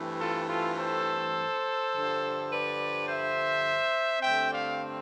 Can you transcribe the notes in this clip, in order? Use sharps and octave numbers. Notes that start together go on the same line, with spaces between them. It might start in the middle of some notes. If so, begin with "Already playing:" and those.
Already playing: G2 E3 A3 C4
F4 A4
F4 A4
A4 C5
G2 D3 F3
B4 D5
C5 E5
G2 D3 A3 C4 E5 G5
D5 F5